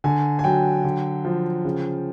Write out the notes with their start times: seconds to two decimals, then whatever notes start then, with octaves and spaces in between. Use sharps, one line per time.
0.04 D3 G#5
0.39 G#5
0.44 F#3 G5
0.84 D3
1.25 F3
1.65 C#3